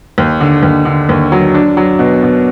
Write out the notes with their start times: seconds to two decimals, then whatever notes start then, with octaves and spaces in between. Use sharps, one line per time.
0.18 D#2
0.40 D3
0.63 D#2
0.85 D3
1.09 D#2
1.32 F#3
1.54 D4
1.77 F#3
1.99 B2
2.23 B2